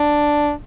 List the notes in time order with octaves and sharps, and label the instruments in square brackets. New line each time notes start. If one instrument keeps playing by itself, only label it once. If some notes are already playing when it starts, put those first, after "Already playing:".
Already playing: [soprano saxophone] D4